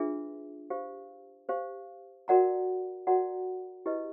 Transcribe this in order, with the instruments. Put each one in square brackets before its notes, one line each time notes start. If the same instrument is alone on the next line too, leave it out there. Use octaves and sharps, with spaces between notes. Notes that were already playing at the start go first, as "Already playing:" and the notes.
Already playing: [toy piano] D4 F4 G#4 B4 E5
G4 C5 F5
G4 C5 F5
F#4 A#4 D5 F#5 A#5
F#4 A#4 D5 F#5 A#5
E4 G4 B4 D#5